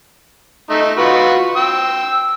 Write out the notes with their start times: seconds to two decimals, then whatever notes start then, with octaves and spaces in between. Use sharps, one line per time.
0.70 A3 D#4
0.98 F4 F#4 B4
1.56 G5 E6